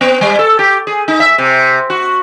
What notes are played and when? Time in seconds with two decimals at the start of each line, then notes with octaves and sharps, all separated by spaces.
0.01 B3
0.21 G3
0.39 A4
0.59 G4
0.87 G#4
1.08 D#4
1.20 E5
1.38 C3
1.90 F#4